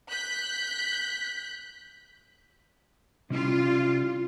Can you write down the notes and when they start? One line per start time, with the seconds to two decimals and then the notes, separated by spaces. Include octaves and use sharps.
0.10 F#6 G6 B6
3.30 C3 G3 C#4 E4 F4